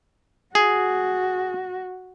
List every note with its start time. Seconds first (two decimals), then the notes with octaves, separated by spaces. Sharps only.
0.55 F#4 G#4